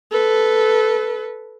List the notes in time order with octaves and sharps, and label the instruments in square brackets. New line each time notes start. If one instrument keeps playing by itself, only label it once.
[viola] A4 B4